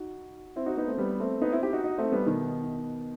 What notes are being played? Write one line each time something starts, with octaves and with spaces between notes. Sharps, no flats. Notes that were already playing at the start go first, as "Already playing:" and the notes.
Already playing: D#4 F#4
C4 E4
D#4 F#4
B3 D#4
A3 C4
G3 B3
A3 C4
B3 D#4
C4 E4
E4 G4
D#4 F#4
D#4 F#4
A3 C4
G3 B3
B2 D#3